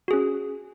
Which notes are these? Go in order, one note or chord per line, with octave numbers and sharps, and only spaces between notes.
C#4 F#4 G#4